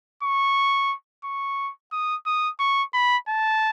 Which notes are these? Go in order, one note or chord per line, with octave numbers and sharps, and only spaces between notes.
C#6
C#6
D#6
D#6
C#6
B5
A5